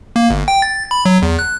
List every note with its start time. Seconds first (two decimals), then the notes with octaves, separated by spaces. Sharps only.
0.16 A#3
0.30 G1
0.48 G5
0.62 A6
0.91 B5
1.05 F#3
1.22 E2
1.39 F#6